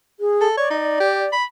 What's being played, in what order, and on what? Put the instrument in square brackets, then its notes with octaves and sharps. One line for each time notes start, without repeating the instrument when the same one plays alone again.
[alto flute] G#4
[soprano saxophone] A4
[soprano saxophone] C#5 [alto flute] D5
[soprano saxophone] D#4
G4
B5